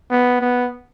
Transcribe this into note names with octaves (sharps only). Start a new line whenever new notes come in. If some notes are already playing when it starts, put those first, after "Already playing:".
B3
B3